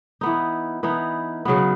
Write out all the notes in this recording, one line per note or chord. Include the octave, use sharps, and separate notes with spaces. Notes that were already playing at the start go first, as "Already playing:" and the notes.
E3 B3 D#4
E3 B3 D#4
C#3 F#3 B3